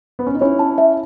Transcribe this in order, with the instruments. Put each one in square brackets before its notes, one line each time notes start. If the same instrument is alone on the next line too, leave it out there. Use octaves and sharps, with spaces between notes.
[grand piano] B3
C#4
D#4
[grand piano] C#4 E4 [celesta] C#5
[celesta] A5
E5